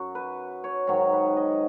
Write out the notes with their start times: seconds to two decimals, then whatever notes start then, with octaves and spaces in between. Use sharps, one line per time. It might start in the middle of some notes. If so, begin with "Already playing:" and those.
Already playing: F#2 F#3 F#4
0.15 B4
0.64 C#5
0.87 G#2 D#3 F#3 C#5
1.13 B4
1.37 D#5